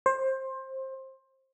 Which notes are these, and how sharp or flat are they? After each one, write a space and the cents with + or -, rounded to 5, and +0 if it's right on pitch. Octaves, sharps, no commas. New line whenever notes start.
C5 +20